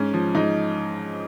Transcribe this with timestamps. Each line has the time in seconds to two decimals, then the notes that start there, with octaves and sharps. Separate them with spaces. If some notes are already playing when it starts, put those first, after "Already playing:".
Already playing: G#2 C#4
0.13 F3
0.35 G#2 D#4